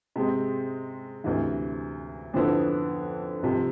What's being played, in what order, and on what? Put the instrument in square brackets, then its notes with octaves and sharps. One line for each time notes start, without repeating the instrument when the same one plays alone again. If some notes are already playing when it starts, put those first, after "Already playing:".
[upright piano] C3 G#3 C4
D2 C3 E3
F2 D3 F3 B3 E4
C2 C3 F3